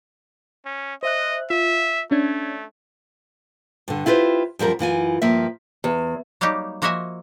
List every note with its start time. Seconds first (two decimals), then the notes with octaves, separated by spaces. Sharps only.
0.66 C#4
1.03 C5 D#5 E5 F#6
1.50 F4 E5
2.11 A3 C#4 D4 G#6
3.88 G2 D3
4.06 E4 F4 G4 B4 C5
4.59 F#2 F3 G3 A#4
4.79 F#2 E3 F4 G#5
5.22 G2 F3 A#3 E5
5.84 E2
6.41 F#3 G3 A#3 D#4 G4
6.82 F3 A#3 F#4 D#5 E5 G#5